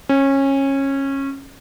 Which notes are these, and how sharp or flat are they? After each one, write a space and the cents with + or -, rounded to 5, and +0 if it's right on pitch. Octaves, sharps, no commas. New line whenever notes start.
C#4 -20